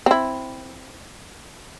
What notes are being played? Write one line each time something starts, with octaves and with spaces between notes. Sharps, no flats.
C4 E4